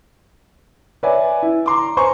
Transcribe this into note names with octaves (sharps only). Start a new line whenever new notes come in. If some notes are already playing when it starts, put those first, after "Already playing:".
B4 C#5 D5 E5 G#5
E4
A#5 C6 D6
B4 C5 G#5 A#5 C6 C#6